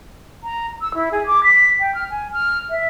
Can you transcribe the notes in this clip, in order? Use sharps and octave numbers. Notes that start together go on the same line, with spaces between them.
A#5
E6
E4
G#4
D6
B6
G5
F6
G#5
F6
E5